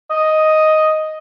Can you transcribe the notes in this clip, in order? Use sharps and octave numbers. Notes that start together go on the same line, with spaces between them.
D#5